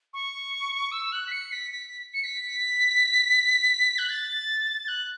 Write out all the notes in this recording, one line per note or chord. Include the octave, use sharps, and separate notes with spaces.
C#6
E6
F#6
B6
C#7
B6
B6
C#7
B6
F#6
A6
F#6